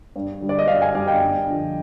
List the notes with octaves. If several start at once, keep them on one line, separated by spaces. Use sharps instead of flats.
G2
D3 G3
D5
D#5
G2 D5 F5
F5 G#5
D3 G3 D5 F5
D#5 G5
G2
D3 F3